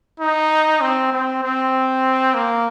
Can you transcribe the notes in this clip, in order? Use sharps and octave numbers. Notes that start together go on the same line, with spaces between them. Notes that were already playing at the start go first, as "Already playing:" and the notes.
D#4
C4
C4
C4
A#3